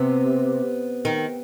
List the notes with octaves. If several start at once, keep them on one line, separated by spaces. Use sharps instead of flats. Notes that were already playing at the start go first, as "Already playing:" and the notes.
Already playing: C3 B3
D#3